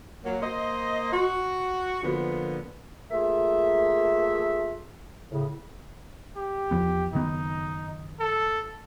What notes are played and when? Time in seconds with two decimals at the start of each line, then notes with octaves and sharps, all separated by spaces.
0.24 F#3 A#3
0.42 A#3 C5 D#5
1.12 F#4
2.03 D3 F3 A#3 B3
3.11 A3 A#3 F4 G#4 E5
5.31 A2 C#3
6.36 G4
6.71 E2 F3 B3
7.13 F#1 D#3 B3 D#4
8.20 A4